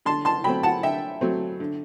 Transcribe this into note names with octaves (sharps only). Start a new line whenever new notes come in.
D3 A5 C6
A5 C6
F#3 A3 C4 G5 B5
F#5 A5
D3 E5 G5
F#3 A3 C4
D3